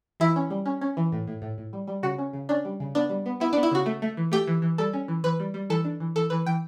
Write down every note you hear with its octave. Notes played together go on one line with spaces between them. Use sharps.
E3 E4
C#4
G3
C#4
C#4
E3
A2
A2
A2
A2
G3
G3
C#3 F#4
C#4
C#3
C#4 D4
G3
C#3
B3 D4
G3
B3
B3 E4
B3 D4
E4
C#3 F#4
A3
A3
E3
A3 G4
E3
E3
G3 A4
C#4
E3
E3 B4
G3
G3
E3 A4
D4
E3
E3 A4
E3 B4
E3 G5